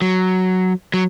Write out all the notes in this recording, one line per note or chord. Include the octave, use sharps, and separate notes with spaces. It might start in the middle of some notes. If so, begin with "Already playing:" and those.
F#3
F#3